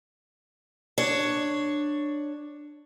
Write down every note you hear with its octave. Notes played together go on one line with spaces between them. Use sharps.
D4 C#5